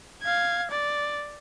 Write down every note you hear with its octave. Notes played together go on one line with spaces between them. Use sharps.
F5 G#6
D5